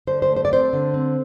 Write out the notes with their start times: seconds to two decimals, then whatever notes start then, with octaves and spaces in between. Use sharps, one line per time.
0.07 D3 C5
0.22 C5
0.29 A3
0.36 C5
0.45 D5
0.51 C4 C5
0.73 D3
0.94 C4